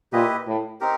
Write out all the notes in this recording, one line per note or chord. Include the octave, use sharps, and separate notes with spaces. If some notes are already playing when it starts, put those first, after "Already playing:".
A#2 E4 G4 B4 D#5
A2
C4 D#4 G4 A#4